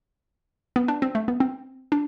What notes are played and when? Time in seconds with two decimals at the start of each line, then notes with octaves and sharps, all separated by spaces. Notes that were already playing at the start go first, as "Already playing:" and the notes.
0.76 B3
0.88 D4
1.02 C4
1.15 A3
1.28 B3
1.40 C4
1.92 D4